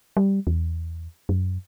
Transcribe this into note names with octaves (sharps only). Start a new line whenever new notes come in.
G3
E2
F#2